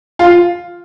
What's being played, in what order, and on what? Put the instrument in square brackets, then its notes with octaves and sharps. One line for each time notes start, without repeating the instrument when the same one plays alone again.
[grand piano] F4